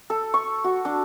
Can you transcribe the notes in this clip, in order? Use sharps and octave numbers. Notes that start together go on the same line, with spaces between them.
A4
C#6
F#4
D4